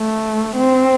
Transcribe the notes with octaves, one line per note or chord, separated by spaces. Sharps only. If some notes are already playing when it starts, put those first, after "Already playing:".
Already playing: A3
C4